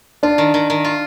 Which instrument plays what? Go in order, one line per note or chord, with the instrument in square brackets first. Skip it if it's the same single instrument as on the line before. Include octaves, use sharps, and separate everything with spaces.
[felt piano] D4 [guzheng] F4
[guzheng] D#3
D#3
D#3
F4